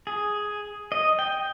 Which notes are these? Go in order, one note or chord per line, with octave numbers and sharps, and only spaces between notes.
G#4
D#5
G5